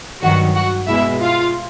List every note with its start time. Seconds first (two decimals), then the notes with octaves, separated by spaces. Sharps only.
0.22 G2 D#3 F#3 F#4 F#5
0.55 F#4 F#5
0.88 B2 G#3 E4 E5
1.22 F4 F5